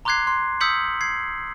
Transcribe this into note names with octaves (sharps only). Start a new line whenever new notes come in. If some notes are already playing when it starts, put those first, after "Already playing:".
A#5 C6 D6 F#6 G#6 C7
C6
D#6 E6 G6 B6 C#7 F#7
G#6 C7